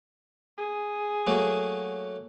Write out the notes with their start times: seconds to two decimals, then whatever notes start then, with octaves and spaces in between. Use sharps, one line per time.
0.57 G#4
1.27 F#3 A3 A#3